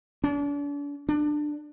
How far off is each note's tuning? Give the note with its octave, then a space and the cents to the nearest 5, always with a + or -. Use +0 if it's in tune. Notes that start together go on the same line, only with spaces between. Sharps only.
D4 -40
D4 +20